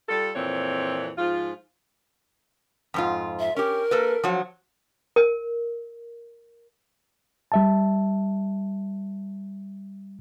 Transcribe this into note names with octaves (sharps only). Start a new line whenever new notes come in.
G3 F4 A4
F2 A#2 E3 C4 C#5
G#2 F3 F4
F2 G#2 F4
E5
C#4 G4 A#4
A#3 A4 B4
F3 F#3
A#4
G3 E5 A5